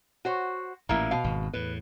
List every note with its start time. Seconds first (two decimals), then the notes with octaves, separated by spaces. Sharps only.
0.25 F#4 C5 C#5
0.89 A1 A#2 A#3 E4
1.11 B2 F5
1.24 G#1
1.53 E2 A2 B4